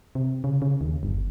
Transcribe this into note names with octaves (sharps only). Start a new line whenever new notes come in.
C3
C#3
C#3
D#2
G1